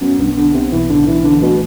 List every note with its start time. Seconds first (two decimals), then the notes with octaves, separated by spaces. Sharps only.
0.01 F#2 B3
0.19 B1 G2
0.37 D3 B3
0.54 C3 B3
0.72 B1 E3
0.89 A2 D3
1.06 A2 E3
1.24 D3 E3
1.41 B2 A3